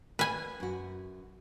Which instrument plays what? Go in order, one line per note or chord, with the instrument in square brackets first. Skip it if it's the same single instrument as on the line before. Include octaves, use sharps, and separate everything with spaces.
[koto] B4 G#5
[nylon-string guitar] F#2 F#4